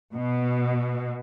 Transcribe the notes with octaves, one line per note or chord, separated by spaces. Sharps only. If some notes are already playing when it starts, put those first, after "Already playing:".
B2